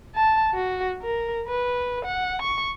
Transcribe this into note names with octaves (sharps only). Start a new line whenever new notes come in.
A5
F#4
A#4
B4
F#5
C#6